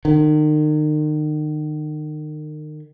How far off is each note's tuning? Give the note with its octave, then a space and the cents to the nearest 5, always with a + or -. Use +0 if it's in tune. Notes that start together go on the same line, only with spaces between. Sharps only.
D#3 -35